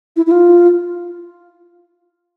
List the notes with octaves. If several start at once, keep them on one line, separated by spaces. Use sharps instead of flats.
E4
E4
F4